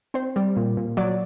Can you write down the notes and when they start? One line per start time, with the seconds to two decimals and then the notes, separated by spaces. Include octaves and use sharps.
0.14 C4 C5
0.36 G3
0.56 A#2
0.77 A#2
0.97 F#3 D5